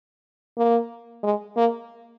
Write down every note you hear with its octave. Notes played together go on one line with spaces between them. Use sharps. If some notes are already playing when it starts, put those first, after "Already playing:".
A#3
G#3
A#3